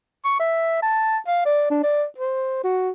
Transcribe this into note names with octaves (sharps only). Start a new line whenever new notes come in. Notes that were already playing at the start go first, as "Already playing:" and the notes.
C#6
E5
A5
F5
D5
D4
D5
C5
F#4